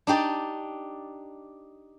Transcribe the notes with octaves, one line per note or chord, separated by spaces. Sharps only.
D4 D#4 G4 D5